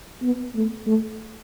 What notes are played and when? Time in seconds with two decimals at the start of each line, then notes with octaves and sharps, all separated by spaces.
0.23 B3
0.55 A3
0.86 A3